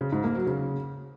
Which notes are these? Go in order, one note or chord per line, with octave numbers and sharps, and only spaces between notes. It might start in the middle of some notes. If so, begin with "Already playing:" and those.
C#3
G#2
A#3
F#3
C#3